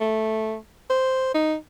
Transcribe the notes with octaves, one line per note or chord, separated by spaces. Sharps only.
A3
C5
D#4